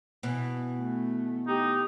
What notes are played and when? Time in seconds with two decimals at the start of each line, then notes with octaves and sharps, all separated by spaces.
0.23 B2 E3
0.79 A3
1.47 D#4 G4